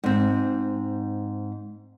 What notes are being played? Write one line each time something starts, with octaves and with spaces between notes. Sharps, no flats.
G#2 C4